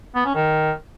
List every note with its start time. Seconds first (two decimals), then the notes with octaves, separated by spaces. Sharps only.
0.15 B3
0.25 C#4
0.35 D#3